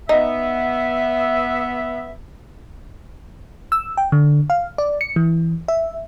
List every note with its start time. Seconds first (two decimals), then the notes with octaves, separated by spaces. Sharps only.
0.09 B3 D#4 E5
3.72 E6
3.97 G5
4.12 D3
4.50 F5
4.78 D5
5.01 C#7
5.16 E3
5.68 E5